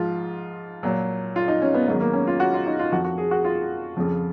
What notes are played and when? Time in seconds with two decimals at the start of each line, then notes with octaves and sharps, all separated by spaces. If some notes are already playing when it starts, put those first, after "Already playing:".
Already playing: G#2 F3 F4
0.83 A#2 F#3
1.36 F4
1.48 D#4
1.62 C#4
1.74 B3
1.87 G#2 D#3 F#3 B3
2.00 A#3
2.13 C#4
2.27 F4
2.40 F#4
2.53 F4
2.66 D#4
2.79 F4
2.92 F2 F3 F#4
3.04 F#4
3.17 G#4
3.31 F#4
3.44 F4
3.97 F2 C#3 F3